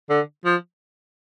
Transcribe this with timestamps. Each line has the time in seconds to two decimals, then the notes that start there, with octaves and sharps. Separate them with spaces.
0.10 D3
0.45 F3